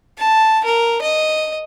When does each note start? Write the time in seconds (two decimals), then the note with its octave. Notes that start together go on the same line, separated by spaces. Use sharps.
0.18 A5
0.65 A#4
1.02 D#5